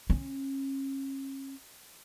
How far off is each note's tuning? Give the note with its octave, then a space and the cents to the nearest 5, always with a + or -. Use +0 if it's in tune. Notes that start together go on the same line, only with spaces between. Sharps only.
C#4 -35